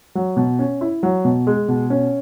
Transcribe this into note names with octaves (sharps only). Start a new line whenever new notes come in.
F#3
B2
C#4
E4
F#3
B2
G#3
B2
C#4